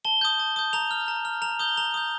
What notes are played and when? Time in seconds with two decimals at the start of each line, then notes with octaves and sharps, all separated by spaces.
0.05 A5 G7
0.21 D#6 G6
0.39 A5
0.56 D#6 G6
0.73 A#5 F7
0.91 F6
1.08 A#5
1.25 F6
1.42 A#5 F7
1.59 D#6 G6 G7
1.77 A#5 F7
1.94 D#6 G6